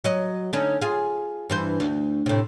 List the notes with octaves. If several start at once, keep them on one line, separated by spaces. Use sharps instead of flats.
F#3 D#5
D3 C#4 D#4
F4 G#4
G2 E3 C5
D2
A2 C3